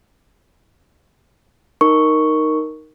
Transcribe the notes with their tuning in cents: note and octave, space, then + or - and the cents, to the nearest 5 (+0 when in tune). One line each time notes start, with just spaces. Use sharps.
D#4 +0 A#4 +0 C#6 +0